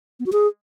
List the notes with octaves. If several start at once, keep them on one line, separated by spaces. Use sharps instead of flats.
B3
F#4
G#4